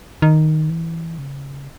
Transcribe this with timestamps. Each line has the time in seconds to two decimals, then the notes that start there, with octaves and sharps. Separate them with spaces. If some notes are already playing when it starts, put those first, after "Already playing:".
0.22 D#3
0.70 E3
1.18 C#3